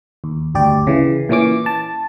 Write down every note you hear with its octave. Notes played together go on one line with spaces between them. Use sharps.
D#2
G1 D2 G4 D5
C#3 E3
A#2 E3 C#4 D6
A5